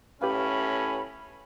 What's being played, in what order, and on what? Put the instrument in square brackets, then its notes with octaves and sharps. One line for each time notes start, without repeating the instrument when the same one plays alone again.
[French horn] A2 [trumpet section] C#4 [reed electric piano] G4 B4 F5 [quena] B5